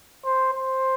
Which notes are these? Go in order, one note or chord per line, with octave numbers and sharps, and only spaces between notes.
C5
C5